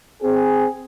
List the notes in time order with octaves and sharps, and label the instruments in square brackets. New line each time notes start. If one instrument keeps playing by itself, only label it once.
[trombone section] C4 G#4